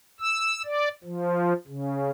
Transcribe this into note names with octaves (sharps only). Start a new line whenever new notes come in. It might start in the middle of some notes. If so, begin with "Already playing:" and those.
E6
D5
F3
C#3